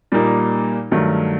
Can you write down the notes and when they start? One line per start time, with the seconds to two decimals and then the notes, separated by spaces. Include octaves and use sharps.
0.12 A#2 G3 A#3 D#4
0.91 G2 D#3 F#3 A3